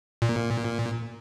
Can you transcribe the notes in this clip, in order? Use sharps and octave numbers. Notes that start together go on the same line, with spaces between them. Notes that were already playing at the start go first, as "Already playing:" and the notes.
A#2